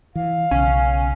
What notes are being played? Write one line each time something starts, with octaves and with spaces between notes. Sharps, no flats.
E3 F5
B1 C#3 C#4